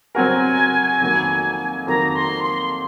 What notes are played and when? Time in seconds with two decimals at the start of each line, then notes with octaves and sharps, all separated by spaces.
0.15 F#3 C4 F#4 A#4 G#5
1.01 F2 D#3 F#3 A#3
1.87 F2 D#3 F#3 A#3 A#5
2.15 C6
2.44 C6